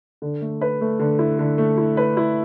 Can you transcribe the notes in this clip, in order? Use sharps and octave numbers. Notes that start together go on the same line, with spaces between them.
D3
A3
B4
A3
D3
E4
D3
A3
E4
B4
E4